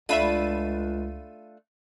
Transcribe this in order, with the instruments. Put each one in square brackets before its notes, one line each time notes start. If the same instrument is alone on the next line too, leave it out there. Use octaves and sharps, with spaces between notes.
[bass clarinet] C#2 [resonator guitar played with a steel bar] A3 D4 F4 [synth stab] E5 B5 D#7